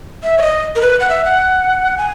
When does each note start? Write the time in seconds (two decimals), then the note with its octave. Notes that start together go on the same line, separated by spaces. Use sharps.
0.23 E5
0.38 C#5
0.42 D#5
0.76 A#4
0.81 B4
1.00 F#5
1.09 E5
1.25 F#5
1.97 G#5